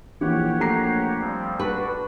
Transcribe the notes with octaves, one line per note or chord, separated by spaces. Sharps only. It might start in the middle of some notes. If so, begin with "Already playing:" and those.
A#1 E3 G4 C#5 F#5
A3 A#5 C7
F3 G3 C4
D4 F#4 B4